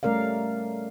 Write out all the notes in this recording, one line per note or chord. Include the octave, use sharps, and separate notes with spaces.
G3 A3 C#4 A#4 D5 F5